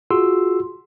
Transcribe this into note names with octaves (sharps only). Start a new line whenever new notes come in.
F4 F#4 G#4 C6 E6